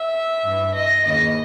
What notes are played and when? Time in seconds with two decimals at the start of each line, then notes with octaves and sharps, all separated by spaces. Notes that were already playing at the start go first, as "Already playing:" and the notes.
Already playing: E5
0.43 G2 E3
0.74 D#5
1.04 D#2 C#3 E3 D#5